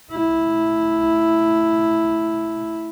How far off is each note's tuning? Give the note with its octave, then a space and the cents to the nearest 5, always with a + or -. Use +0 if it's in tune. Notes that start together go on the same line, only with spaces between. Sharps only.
A3 +0 E4 +0